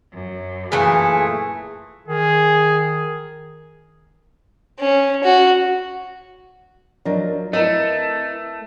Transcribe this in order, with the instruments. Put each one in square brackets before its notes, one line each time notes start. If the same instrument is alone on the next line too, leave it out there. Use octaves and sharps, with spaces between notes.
[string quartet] F#2
[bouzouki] A#2 E3 A3 [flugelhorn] G#4
[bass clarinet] D#3 [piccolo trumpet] G#4
[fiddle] C#4
F#4
[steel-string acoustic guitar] F3 F#3 [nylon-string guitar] D4 A#4 D#5
[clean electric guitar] A3 [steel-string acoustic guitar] C4 B4 [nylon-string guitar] E4 A#4 D#5